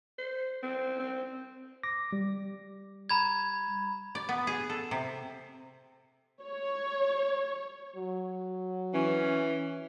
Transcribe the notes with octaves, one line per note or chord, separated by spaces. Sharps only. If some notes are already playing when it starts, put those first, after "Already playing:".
C5
C4
C4
D6 A#6
G3
A#5 B5 G#6
D5
B3
G#4
A4
C3
C#5
F#3
E3 C#4